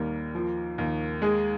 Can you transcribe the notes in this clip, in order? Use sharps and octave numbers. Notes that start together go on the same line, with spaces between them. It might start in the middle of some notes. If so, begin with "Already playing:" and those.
Already playing: D#2 G3 A#3 A#4
F3
D#2
G#3 G#4